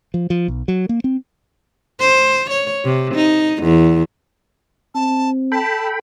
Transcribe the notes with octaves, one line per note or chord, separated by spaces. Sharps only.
F3
F3
B1
F#3
A#3
C4
C5
C#5
C3
D#4
E2
C4 A5
A4 G5 A5 B5